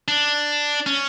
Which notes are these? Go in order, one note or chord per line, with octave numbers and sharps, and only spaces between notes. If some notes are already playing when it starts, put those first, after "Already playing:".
D4
C#4